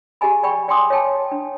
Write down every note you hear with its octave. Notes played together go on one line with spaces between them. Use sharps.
G4 G#4 D#5 G#5 B5
D5 G5 B5 C#6
D5 G5 G#5 C6 D6 D#6
C#5 D#5 G5 A5
D4